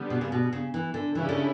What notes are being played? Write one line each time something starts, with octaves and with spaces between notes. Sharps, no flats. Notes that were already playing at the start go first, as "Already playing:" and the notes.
Already playing: D3 G3 B3
B2
C#3
B2
C#3
E3
D3
C#3 E3 G3 C#4 E4
D3